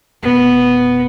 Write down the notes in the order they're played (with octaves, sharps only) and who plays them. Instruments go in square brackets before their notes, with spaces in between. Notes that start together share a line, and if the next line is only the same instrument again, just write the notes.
[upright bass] F1 B2 [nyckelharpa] B3